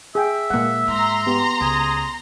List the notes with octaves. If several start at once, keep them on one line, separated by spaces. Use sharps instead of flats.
G#4 E5 G5
A#2 G#3 A#3 F#5
G#2 A#5 C6
B3 G4
C#2 G#4